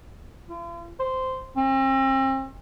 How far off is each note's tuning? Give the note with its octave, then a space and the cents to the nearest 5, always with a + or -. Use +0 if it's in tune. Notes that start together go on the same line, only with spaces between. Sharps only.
F4 -45
C5 -10
C4 +40